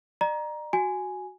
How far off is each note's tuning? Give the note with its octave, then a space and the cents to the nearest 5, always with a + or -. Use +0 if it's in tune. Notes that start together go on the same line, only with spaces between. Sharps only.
D5 +45 A#5 +15
F#4 +0 G#5 +0